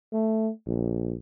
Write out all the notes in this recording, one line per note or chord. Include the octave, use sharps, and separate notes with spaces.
A3
A#1